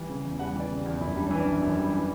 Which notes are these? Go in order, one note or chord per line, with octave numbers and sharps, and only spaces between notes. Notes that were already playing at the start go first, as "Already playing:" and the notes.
Already playing: E3 G3
C#3
E2
G3 F#5
E3 D5
C#3
G4
E2
F#2 E4
G3 D4
E3 C#4
D4
F#2
F#2
G3
E3